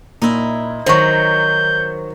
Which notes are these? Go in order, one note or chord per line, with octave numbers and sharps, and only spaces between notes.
A#2 D#4 E4
D#3 F#3 C5 C#6 G6